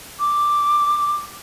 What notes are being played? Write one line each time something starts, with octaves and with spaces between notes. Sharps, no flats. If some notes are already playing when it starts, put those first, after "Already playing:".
D6